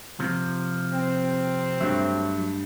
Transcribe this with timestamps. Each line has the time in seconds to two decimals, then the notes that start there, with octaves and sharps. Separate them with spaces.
0.20 C3 F3
0.94 C4
1.80 G2 F#3 A3